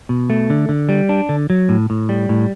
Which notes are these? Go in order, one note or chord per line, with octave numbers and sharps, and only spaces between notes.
B2
A3
D3
D3
G3
D4
D3
F#3
A2
A2
G3
A2